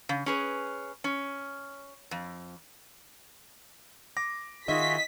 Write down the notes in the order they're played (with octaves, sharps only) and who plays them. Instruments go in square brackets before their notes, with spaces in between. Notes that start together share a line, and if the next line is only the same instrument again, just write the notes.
[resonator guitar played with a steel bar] C#3
C#4 G#4 B4
C#4
F2
[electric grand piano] D6 A#6
[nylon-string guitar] D#3 D#4 E5 [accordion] F4 F#4 G#4 [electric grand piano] D#5 [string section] B6